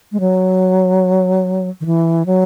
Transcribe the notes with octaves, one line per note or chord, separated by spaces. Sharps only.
G#3
F#3
D#3
E3
F#3